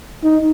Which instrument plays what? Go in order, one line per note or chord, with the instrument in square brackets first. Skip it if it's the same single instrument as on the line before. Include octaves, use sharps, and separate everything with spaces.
[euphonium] D#4